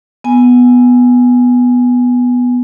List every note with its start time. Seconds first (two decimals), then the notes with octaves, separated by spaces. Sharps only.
0.24 B3 G#5